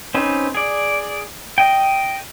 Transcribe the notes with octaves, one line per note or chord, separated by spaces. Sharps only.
C4 C#4 D#4 B4 C5
G#4 D5
D#5 G5